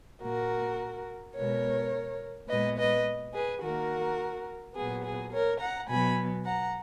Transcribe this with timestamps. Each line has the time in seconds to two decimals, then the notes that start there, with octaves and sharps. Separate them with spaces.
0.22 A#2 A#3 F#4 A#4
1.35 B2 G#3 B3 A#4 C#5
2.49 A#2 G#3 B3 B4 D#5
2.78 B4 D#5
3.34 G#4 B4
3.62 D#3 A#3 F#4 A#4
4.75 A#2 F#3 B3 G#4
5.04 G#4
5.33 A#4 C#5
5.60 F#5 A#5
5.89 B2 F#3 B3 G#5 B5
6.45 F#5 A#5